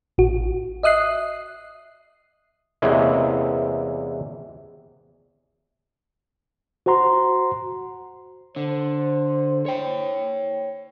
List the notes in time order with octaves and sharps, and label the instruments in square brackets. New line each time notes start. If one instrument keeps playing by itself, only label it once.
[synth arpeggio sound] A1 F#4
D#5 E5 D#6 F#6 C7
[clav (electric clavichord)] E2 C3 E3 G#3 A#3 C#4
[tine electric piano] F#4 C5 F#5 A#5 C6
[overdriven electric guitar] D3 [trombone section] C5
[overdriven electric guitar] C#5 G5